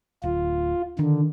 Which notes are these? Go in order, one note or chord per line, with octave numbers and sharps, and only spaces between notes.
D1 F4
D3 D#3